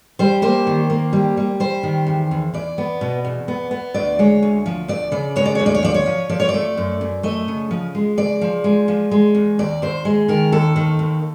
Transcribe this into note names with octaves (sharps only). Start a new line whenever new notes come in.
G3 C5
A#3 C5
D#3
A#3
G3
G3
G3 C5
D#3
E2
E2
E2 D5
B3
B2
E2
B3
B3
D2 D5
G#3 C#5
D2
F3
D2 D5
C#3 D5
G#3 C#5
D5
D2 C#5
D5
C#5
F3 D5
C#5
F3
F3 D5
C#5
D5
A3
F#2
F#2
A3 D#5
C#3
F3
G#3
C#3 D5
F3
G#3
F3
G#3
E2
D#2 D5
D#2 C5
G#3
D#3 A#4
D#2 A4
D#3
D#2